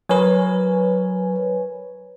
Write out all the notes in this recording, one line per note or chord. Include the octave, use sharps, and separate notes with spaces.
F#3 A#4 B4 C#5 G#5